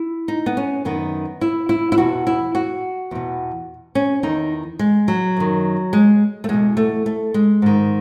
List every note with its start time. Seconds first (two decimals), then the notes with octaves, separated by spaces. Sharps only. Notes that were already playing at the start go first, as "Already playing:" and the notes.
Already playing: E4
0.28 D#4
0.46 B3
0.57 C#4
0.85 F#2 D#3 B3
1.41 E4
1.69 E4
1.92 E4
1.98 E2 B2 F#4
2.27 E4
2.55 F#4
3.11 E2 B2
3.95 C#4
4.23 E2 D#3 D#4
4.79 G#3
5.08 F#3
5.37 F#2 D#3
5.93 G#3
6.44 A3
6.48 E2 B2 G#3
6.77 A3
7.06 A3
7.34 G#3
7.62 G#2 D#3